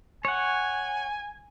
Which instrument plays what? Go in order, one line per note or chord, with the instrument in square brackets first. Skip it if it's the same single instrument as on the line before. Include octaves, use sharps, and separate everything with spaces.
[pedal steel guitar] C#5 F#5 [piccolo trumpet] G#5